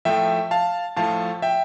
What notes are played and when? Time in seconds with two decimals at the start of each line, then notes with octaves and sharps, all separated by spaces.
0.05 A2 F3 A3 E5 G5
0.51 F5 A5
0.96 A2 F3 A3 F5 A5
1.42 E5 G5